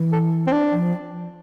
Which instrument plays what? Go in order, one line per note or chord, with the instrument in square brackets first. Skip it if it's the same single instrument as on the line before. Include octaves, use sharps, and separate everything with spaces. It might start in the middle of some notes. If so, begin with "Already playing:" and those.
Already playing: [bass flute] E3
[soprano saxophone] A4
C4
D4
[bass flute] F3